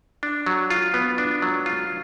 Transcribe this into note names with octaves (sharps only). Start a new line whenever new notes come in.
D4
F#3
F4
B3
D4
F#3
F4